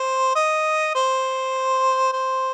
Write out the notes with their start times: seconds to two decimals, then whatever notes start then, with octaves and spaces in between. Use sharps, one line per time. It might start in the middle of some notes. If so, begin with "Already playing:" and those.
Already playing: C5
0.35 D#5
0.95 C5
2.13 C5